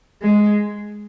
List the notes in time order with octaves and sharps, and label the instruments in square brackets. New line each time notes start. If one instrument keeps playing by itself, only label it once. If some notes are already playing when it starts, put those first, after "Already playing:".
[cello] G#3